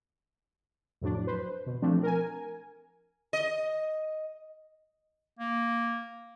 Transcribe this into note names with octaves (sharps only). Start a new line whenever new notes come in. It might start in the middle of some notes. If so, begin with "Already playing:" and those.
F2 A2 F#3 D4
B4 C5
B2
F3 A3 C4 D4
A#4 G#5
D#5
A#3